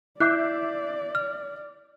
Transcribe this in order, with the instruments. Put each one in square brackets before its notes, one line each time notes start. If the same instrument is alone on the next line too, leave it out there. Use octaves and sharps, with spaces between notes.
[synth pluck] E4 [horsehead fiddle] D5 [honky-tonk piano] E5 D6 G6 [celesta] F#6 C7
[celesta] F6